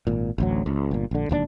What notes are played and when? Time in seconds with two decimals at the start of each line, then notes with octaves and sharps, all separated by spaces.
0.07 G#1 A#2
0.38 A1 D2 F#3
0.66 C#2
0.91 G1 A#2
1.11 A#1 D3
1.29 E1 D#2 E3 D4